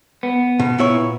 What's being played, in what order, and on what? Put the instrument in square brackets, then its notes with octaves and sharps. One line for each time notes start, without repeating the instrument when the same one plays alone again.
[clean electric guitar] B3
[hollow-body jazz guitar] B2
A#2 E4 C#5